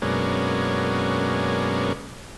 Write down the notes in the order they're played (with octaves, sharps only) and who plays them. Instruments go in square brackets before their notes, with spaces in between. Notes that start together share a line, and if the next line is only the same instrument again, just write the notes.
[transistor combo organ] F#2 B2 G#3 A#3 C#4 D4